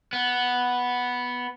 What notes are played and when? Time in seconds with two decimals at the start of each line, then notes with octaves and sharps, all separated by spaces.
0.13 B3